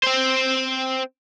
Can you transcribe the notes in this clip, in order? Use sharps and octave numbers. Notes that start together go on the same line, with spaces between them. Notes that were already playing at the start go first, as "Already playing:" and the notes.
C4 C5